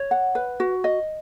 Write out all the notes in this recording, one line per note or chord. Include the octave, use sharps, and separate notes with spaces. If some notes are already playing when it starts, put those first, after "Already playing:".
Already playing: C#5
F#5
B4
F#4
D#5